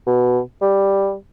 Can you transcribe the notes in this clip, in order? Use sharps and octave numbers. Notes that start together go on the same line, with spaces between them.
B2
G3